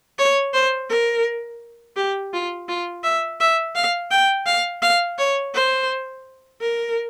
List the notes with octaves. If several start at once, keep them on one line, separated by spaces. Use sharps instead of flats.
C#5
C5
A#4
G4
F4
F4
E5
E5
F5
G5
F5
F5
C#5
C5
A#4